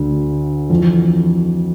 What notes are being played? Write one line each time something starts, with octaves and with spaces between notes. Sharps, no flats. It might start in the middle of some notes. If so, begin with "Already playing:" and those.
Already playing: D2 D3
F2 E3